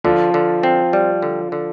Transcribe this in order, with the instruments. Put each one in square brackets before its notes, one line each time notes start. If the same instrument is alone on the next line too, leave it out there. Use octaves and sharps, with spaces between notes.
[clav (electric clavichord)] D3 [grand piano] F3 F4
[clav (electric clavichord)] D3
C4
G3
D3
D3